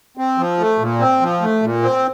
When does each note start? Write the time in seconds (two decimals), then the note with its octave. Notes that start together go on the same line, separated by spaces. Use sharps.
0.17 C4
0.38 F3
0.59 A3
0.79 A#2
1.00 C4
1.21 F3
1.41 A3
1.62 A#2
1.82 C4